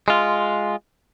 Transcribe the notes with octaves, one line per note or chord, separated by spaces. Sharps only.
G#3 F4